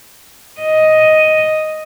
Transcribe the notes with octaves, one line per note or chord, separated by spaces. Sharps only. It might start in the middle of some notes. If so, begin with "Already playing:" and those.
D#5